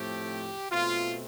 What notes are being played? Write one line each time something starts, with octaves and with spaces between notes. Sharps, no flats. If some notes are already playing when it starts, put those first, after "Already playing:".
Already playing: A2 F3 A3 C4 G4
B2 A3 C4 F4